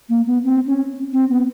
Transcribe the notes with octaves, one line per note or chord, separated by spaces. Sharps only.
A#3
B3
C4
C#4
C4
B3